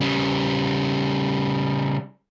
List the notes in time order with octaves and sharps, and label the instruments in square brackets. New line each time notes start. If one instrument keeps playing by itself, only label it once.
[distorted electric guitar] C#3 G3